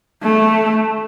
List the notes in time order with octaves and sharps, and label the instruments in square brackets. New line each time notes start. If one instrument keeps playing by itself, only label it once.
[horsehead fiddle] A3